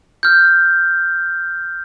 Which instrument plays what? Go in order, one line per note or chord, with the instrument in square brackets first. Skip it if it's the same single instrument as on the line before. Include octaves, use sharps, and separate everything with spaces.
[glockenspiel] F6 G6